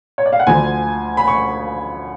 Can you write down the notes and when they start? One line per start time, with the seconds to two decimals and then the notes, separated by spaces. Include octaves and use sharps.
0.18 C#5
0.26 D5
0.33 F5
0.40 F#5
0.47 D2 D3 F3 G#5
1.17 B5
1.28 C#6